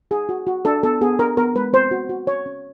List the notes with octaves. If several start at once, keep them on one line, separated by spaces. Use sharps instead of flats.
D#4 G#4
F#4
F#4
D4 A4
B3 A4
B3 G#4
D4 A#4
B3 A#4
G#3 B4
C4 C5
F#4
F#4
C#4 C#5
C#4